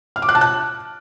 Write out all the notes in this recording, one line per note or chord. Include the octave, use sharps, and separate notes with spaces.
F6
D6
F#6
A5
F#6